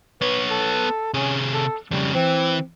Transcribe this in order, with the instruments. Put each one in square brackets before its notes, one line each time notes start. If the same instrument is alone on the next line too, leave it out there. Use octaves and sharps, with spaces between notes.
[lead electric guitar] B3 C#5 [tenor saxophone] B4
[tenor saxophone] A4
[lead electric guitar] C3 G#4 [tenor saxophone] C#4
[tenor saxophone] A4
[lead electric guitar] F2 C#3 [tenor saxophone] G3
[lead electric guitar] E3 [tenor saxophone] C4